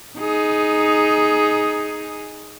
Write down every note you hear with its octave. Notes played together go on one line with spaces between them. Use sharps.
D#4 G#4